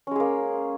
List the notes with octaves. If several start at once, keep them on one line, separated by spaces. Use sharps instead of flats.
G#3 A#3 C#4 G#4